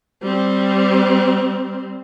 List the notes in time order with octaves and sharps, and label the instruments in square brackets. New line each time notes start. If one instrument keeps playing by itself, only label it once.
[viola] G3 C4